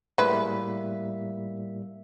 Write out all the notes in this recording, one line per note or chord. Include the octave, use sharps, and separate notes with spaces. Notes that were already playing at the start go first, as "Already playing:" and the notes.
A2 G3 G#3 A#3 B4 E5